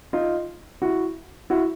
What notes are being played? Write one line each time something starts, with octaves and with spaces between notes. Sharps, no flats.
D#4 F4
E4 F#4
E4 F#4